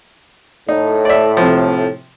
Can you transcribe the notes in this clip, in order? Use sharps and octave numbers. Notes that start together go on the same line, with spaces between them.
A2 D#4
D5 E5
C3 F3